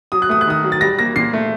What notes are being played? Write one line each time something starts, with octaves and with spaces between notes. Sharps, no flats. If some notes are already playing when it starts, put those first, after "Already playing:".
F#3 D#6
F#6
A3 D#6
F#6
D#3 D#6
F#3
A6
G3 A#6
A#3 A#6
A#2 C7
A3